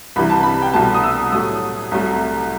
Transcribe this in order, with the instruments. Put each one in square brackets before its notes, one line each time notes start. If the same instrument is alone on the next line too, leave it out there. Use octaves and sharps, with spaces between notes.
[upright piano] C2 C3 E3 B5
A5
B5
G5
C2 B2 A3 A5
D#6
E6
A2 F#3 A3 D#6
C2 C3 F#3 A3